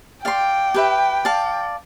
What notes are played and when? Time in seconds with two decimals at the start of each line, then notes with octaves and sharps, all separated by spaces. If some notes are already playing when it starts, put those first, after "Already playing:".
0.25 D5 F5 G5 C6
0.74 G4 B4 E5
1.25 D5 F5 A5